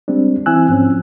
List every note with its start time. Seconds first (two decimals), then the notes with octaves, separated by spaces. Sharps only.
0.08 G3 G#3 C4 D4
0.46 E3 C4 E4 G#5 E6 F#6
0.69 G#2 F3 C4 C#4